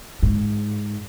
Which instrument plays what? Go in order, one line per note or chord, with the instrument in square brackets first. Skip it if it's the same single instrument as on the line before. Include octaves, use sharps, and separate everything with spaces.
[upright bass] G#2